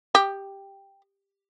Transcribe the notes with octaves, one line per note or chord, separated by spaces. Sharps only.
G4